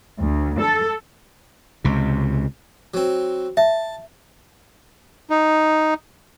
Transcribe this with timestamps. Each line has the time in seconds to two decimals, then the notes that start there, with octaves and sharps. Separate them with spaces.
0.20 D2
0.61 A4
1.84 C#2 C3
2.94 F#3 C4
3.57 E5 A5
5.30 D#4